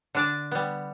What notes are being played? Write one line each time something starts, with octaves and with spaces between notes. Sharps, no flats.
D3 D4 D5
G3 B3